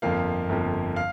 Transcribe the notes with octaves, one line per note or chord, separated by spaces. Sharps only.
G1 F2 F3 A#3 F5
G1 F2 F3 A#3
F5